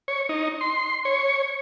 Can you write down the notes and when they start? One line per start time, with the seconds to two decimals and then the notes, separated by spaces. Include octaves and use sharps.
0.08 C#5
0.29 D#4
0.61 C6
1.05 C#5